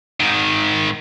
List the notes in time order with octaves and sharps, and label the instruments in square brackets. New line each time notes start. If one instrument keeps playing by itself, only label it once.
[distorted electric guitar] G#2 D#3